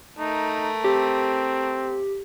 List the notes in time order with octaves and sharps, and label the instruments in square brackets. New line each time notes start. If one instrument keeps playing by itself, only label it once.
[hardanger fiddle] A3 A#4 [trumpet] D#4
[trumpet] C4 [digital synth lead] G4